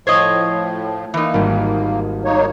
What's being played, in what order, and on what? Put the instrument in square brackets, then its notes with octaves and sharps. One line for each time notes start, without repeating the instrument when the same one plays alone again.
[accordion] A2 F3 [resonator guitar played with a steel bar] C5 C#5 D#5 [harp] G#6
[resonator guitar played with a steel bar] E3 D#4 [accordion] A#3
[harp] G#1 G3
[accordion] A#3 D#4 C#5